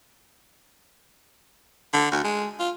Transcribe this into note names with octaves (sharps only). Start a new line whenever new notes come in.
D3
D2
G#3
F4